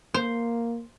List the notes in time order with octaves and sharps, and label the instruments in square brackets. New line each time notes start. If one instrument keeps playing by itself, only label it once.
[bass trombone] A#3 [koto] C5